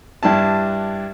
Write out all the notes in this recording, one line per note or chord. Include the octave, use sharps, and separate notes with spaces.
G2 D4 E4 A5